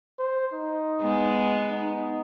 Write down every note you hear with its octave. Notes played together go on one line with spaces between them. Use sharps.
C5
D#4
G#3 B3
D#4